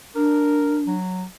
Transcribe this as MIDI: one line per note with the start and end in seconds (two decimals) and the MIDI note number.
0.15 0.91 62
0.15 0.78 70
0.87 1.25 54